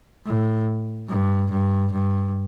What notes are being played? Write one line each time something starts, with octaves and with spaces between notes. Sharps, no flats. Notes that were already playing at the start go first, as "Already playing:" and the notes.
A2
G2
G2
G2